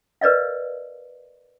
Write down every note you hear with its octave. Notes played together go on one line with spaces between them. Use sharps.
A#4 B4 D5 D#5 F5